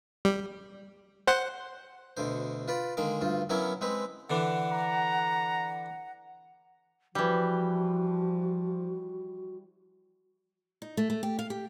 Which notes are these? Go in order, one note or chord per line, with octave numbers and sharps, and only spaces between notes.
G3
C5 F#5
D2 B2 D3 C5
F4 B4 D5
D3 D#3 G#3 A#3 D6
D2 G2 F4
F#3 B3 C#4 E4 A#4 C#5
G#3 C4 B4
D3 E3 D4 F#5
A#5
E3 F3 G3 F#4
D#4
A3
A3
G4
F5
G4